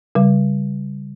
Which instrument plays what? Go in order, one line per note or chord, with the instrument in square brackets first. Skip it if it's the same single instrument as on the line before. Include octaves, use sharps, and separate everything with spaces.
[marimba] C#3 G3